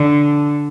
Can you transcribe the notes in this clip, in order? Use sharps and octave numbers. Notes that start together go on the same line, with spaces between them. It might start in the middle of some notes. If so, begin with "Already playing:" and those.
Already playing: D3